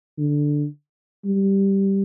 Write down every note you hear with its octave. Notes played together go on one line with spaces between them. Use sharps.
D3
G3